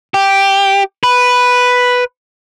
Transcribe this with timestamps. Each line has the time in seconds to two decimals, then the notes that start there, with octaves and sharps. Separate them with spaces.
0.14 G4
1.03 B4